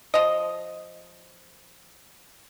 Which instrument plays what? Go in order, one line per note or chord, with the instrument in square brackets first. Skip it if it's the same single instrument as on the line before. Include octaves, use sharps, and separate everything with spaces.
[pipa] F3 D#5